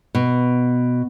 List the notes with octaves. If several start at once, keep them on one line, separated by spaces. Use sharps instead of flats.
B2